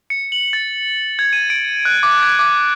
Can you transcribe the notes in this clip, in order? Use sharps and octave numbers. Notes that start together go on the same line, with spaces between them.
C#7
F#7
A6
G#6
D#7
D7
F#6
D6
G#6
D6